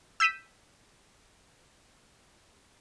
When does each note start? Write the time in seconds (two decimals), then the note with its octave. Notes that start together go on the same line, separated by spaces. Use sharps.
0.20 E6 G6 B6 D#7 E7